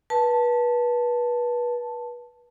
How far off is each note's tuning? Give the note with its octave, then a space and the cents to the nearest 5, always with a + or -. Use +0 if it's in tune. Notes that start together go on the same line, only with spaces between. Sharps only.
B4 -30 A5 +0